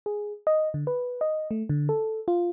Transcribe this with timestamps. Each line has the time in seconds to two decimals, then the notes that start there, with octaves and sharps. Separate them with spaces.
0.06 G#4
0.47 D#5
0.74 D3
0.87 B4
1.21 D#5
1.51 A3
1.69 D3
1.89 A4
2.28 F4